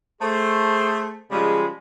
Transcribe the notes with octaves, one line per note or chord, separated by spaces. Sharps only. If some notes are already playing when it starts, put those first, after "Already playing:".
A3 G#4 C5
C#3 F3 G3 G#3